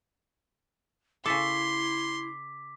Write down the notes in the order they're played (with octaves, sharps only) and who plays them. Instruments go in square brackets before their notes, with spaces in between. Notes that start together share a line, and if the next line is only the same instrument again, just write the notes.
[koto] C#3 A4 [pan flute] E4 [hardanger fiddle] C6 [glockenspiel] D6 B6